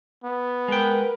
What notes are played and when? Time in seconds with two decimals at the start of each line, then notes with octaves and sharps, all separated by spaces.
0.24 B3
0.68 G#3 A#4 B4 G5